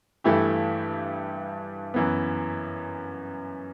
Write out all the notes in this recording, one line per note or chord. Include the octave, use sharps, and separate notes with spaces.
G2 E3 A3 E4 G4
F#2 E3 B3